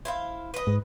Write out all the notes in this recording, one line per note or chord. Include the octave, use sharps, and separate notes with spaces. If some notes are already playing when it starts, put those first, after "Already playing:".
E4 C5 F5
B4 D#5
G#2